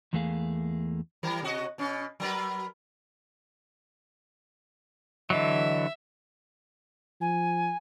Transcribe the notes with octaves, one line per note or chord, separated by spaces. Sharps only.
E2 E3 A3 A#3 G#4 F5
E3 G3 A#4
C3 F#4 D#5
B2 C#4
F#3 A#4 B4
D3 E3 F#3 D#5 E5
F3 G#5